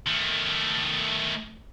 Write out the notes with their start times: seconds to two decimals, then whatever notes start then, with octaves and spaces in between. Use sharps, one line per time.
0.07 D#3 A3